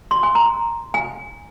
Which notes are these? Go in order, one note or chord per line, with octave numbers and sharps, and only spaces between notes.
C6
G#5
A#5
G#5